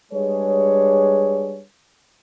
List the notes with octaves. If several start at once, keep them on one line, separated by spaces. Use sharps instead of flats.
G3 G#3 D4 G#4 B4 C#5